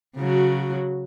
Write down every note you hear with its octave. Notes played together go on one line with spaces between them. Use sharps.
C#3 F#3 F#4